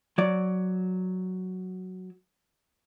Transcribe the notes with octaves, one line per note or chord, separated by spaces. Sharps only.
F#3 D5